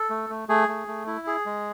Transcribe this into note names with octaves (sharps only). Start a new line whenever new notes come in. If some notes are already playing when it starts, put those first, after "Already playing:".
Already playing: A4
A3
A3
A3 G#4
A3
A3
E4
G#4
G#3